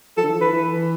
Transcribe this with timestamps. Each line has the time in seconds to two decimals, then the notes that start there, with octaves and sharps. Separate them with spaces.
0.17 F3 A4
0.23 D3
0.28 E3
0.36 F3
0.41 E3 B4
0.53 E3